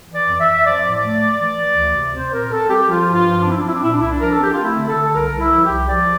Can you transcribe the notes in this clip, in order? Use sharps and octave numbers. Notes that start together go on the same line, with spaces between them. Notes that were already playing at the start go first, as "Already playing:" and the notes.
E3
D5
F2
E5
F2
F3 D5
A2
A3
F3
E3
E3
D2
C3
C4 C5
A#2 A#4
C4 A4
G3 G4
F3 F4
G2
F4
F3
D4
C4 E4
D4
F3 E4
D4
A#2 E4
D4
C2 E4
D4
F3 A#4
A4
C4 G4
A3 F4
E4
D3
A4
D3
A4
C2 A#4
C2
E4
F3
G4
C2
F3 D5